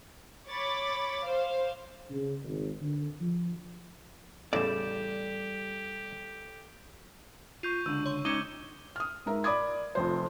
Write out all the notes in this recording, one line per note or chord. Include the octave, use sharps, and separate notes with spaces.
C#5 B5 D6 A6
C5 F5
C#3
G#1
D3
F3
A1 E2 C#3 G3 G4 A4 D5 E7
F4 C#6 G6 D#7
C#2 D3 E6 G6 D#7
C#5 C6
G#3 C#4 D#4 C#5 D6 D#7 E7 G7
D#6 F6
G#2 A#4 E5
D5 B5 D6 D#6 G#6
F1 F2 C5